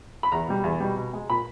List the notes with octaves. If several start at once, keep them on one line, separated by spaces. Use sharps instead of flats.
B5
E2 A#5
B2 G3
E2
B2 G3
B2
G#3
A#2 B5